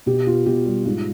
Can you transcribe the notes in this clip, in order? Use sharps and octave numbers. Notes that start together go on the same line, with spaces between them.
B2 G4
B3 F4
B2 G4
G3
G#2 F4